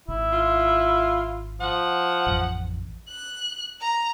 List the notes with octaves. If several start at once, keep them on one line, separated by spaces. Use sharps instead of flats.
G#1 E4
F4
F3 F#5
A1 F2
F#6
A#5